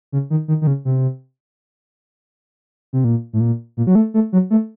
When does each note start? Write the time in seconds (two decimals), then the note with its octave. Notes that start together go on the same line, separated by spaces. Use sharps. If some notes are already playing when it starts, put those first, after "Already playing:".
0.12 C#3
0.30 D#3
0.48 D#3
0.62 D#3
0.67 C#3
0.85 C3
2.93 C3
3.04 A#2
3.33 A2
3.40 A#2
3.77 A#2
3.87 F#3
3.95 A3
4.14 A3
4.32 F#3
4.50 A3